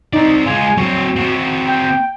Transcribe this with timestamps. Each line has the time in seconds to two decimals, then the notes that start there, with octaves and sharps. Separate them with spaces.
0.13 C4 D#4 D5
0.46 G#3 F4 G#5
0.77 F#3 C4 C#5
1.16 C4 F#4
1.68 G5